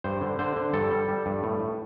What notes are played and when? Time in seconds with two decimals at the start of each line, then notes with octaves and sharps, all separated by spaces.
0.04 G2 C5
0.21 D3
0.39 D3 C5
0.56 D3
0.73 G2 A4
0.91 G3
1.08 G3
1.26 G2
1.43 A2
1.60 A2